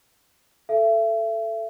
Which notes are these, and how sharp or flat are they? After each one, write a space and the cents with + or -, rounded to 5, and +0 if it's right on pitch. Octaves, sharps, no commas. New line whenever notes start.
A4 +0 E5 +35